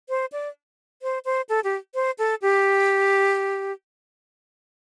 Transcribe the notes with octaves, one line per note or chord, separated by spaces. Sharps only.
C5
D5
C5
C5
A4
G4
C5
A4
G4